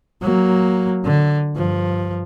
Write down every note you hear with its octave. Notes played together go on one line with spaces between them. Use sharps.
F#3 A#3
D3
G2 F3